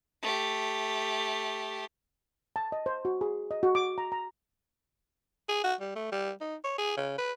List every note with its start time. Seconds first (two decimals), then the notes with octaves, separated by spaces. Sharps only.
0.22 A3 G4
2.56 A5
2.72 D#5
2.86 C5
3.05 F#4
3.21 G#4
3.51 D#5
3.63 F#4
3.75 D6
3.98 A#5
4.12 A#5
5.49 G#4
5.64 F#4
5.81 G3
5.95 A3
6.12 G3
6.41 D#4
6.64 C#5
6.78 G#4
6.97 C#3
7.18 B4